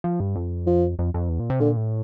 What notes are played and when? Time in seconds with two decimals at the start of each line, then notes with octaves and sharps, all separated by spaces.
0.04 F3
0.20 G2
0.36 F2
0.67 F3
0.99 F2
1.14 F2
1.29 E2
1.40 A#2
1.50 C3
1.60 A#2 D3
1.77 A2